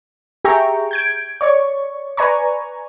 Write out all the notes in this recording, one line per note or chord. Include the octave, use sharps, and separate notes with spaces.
G4 G#4 E5 G5 A#5 C#6
G6 G#6 D7
C#5 D5 C#6
B4 D5 G#5 A#5 C#6